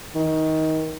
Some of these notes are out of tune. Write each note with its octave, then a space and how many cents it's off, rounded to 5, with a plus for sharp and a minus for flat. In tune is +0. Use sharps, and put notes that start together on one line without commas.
D#3 +20